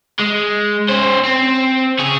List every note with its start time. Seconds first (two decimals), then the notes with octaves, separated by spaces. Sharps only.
0.20 G#3
0.89 C#4 C5
1.24 C4
1.99 C#4 G#4